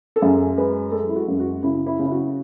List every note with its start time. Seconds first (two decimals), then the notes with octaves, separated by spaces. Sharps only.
0.16 A4
0.21 F#2 G#4
0.57 G#3 B4
0.92 G#3 A4
1.08 E4
1.16 F#4
1.28 F#2
1.40 F#4
1.63 C#3 E4
1.86 E4
1.99 C#3
2.05 E4
2.11 F#4